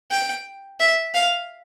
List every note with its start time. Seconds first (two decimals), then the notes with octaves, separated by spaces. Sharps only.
0.11 G5
0.80 E5
1.14 F5